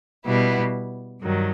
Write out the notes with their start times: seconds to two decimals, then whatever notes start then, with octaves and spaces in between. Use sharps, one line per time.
0.25 B2 G3 B3 E4
1.21 G2 D#3 F#3